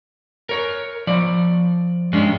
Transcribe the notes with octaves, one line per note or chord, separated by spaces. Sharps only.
A#4 C#5
F3 D5
G2 G#3 C#4 D4